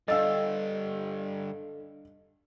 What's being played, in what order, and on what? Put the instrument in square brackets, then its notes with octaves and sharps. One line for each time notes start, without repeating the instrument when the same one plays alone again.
[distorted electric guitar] G2 D3 [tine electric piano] D4 A4 [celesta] D#5 [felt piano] F5 E6 A6